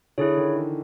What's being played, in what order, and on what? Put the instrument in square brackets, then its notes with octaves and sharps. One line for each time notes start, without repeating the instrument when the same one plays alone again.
[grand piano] D3 [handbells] E4 G#4 C#5
[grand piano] D#3
E3